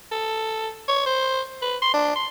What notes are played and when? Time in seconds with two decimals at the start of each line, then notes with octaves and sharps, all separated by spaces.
0.12 A4
0.88 C#5
1.06 C5
1.62 B4
1.82 C6
1.94 D4
2.16 C6